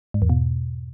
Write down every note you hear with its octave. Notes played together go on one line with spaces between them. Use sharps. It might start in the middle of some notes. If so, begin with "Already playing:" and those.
G#2
E2
B2